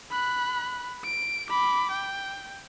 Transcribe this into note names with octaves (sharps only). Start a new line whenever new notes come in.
B5 F#6
D7
B5 D6
G5